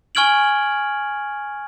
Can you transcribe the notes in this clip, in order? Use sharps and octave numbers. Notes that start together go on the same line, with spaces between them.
G#5 C#6 F6 G#6 D7 F#7